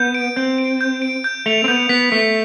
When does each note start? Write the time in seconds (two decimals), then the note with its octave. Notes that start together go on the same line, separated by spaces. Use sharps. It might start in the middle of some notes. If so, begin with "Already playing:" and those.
Already playing: B3 G6
0.14 D7
0.36 C4 G6
0.58 D7
0.81 G6
1.02 D7
1.24 G6
1.46 A3 F7
1.64 C4
1.68 B3 G6
1.89 B3 B6
2.12 A3 B6